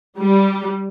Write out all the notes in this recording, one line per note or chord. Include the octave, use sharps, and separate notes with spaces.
G3